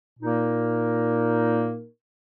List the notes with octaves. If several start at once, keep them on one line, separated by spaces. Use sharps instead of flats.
A#2 A#3 D#4 A#4